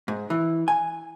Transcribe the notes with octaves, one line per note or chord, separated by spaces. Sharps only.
G#2
E3
G#5